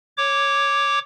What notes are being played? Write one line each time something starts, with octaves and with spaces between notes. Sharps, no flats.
C#5 D6